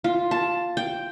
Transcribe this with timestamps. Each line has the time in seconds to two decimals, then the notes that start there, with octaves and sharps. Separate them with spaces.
0.04 F4
0.31 A5
0.77 G5